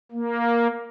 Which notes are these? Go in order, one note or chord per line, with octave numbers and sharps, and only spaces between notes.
A#3